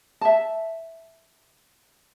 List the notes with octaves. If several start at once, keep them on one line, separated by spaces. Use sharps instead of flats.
E5 A5